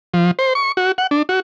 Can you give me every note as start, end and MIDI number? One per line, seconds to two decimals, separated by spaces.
0.14 0.31 53
0.39 0.53 72
0.55 0.72 85
0.77 0.92 66
0.98 1.07 78
1.11 1.22 62
1.29 1.40 66